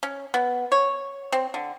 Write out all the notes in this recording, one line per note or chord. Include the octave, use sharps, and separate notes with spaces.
C#4
B3
C#5
C4
D3